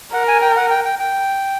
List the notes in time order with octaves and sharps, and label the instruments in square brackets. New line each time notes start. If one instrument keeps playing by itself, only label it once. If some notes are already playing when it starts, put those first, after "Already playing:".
[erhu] A#4 [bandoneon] F#5
[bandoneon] G#5
G5
F#5
G5
G5
G5